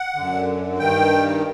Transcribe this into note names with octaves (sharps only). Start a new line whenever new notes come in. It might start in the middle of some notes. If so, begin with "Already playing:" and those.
Already playing: F#5
F#2 D3
G2 D#3 G5